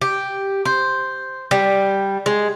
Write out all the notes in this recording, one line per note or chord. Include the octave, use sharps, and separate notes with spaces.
G4
C5
G3
G#3